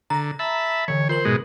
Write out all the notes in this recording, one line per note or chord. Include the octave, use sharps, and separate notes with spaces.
D3 A#5 A#6
E5 A5 B5
D3 E3 C#5
F4 A#4 C5 F#7
G#2 B2 G#3